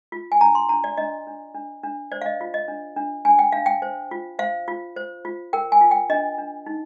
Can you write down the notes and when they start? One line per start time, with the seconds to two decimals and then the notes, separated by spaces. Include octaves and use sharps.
0.12 F4
0.32 G#5
0.41 D4 A#5
0.55 C6
0.69 D4 A#5
0.84 D5
0.97 D4 D#5
1.27 D4
1.55 D4
1.83 D4
2.12 C5 D5
2.22 F5
2.26 D#5
2.41 F4
2.54 D#5
2.68 D4
2.96 D4
3.25 D4 G#5
3.39 G5
3.52 D4 F5
3.66 G5
3.82 C5
4.11 F4
4.39 C5 F5
4.68 F4
4.96 C5
5.25 F4
5.53 A#4 G5
5.72 G#5
5.81 F4
5.91 G5
6.10 D4 D#5
6.38 D4
6.66 D#4